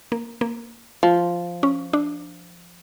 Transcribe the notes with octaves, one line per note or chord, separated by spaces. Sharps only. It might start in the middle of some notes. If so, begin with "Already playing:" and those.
A#3
A#3
F3
C#4
D4